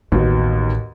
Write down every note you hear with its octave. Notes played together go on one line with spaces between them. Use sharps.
A1 D#2 B2